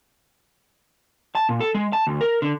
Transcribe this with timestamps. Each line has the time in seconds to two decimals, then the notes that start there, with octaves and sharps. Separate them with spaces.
1.35 A5
1.49 A#2
1.60 A4
1.74 G#3
1.93 A5
2.07 D2
2.21 A#4
2.42 D3